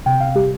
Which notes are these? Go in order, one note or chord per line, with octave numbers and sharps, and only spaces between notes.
C3 G5
C3 F5
G3 G4